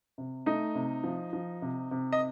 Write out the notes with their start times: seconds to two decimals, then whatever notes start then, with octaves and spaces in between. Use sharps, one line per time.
0.18 C3
0.46 A3 D#4 D#5
0.75 C3
1.04 F3
1.33 F3
1.62 C3
1.91 C3
2.13 D#5